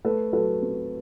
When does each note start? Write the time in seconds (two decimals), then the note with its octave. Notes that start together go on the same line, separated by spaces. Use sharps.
0.05 A3 A4 B4
0.33 F#3 A4 B4
0.62 C4